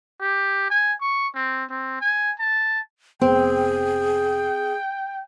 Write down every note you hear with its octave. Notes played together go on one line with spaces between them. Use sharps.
G4
G#5
C#6
C4
C4
G#5
A5
F1 B3 C4 G#4 G5